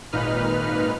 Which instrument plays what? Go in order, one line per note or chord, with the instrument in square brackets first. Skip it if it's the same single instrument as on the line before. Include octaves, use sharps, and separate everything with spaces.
[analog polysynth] G#1 A#2 D#4 B4 F6